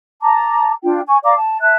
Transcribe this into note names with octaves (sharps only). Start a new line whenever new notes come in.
A5 A#5 D6
D4 F4 G5
G#5 C#6
D5 F5 A#5 D6
A5
E5 A5 F#6